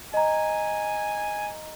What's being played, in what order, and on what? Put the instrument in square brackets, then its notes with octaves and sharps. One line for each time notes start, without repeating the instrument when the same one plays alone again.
[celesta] D#5 A#5 [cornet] G#5